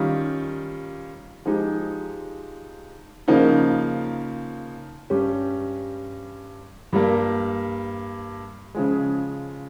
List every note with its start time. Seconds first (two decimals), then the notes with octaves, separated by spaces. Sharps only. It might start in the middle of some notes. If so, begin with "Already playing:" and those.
Already playing: D#3 G3 C#4 F4
1.46 F3 G#3 D#4 G4
3.28 C#3 F3 A#3 D#4
5.10 G2 G3 C#4 G4
6.93 G2 G3 A#3
8.75 C#3 F3 G#3